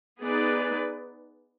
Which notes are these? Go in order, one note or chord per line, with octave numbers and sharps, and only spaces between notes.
B3 D#4 G#4 B4 D5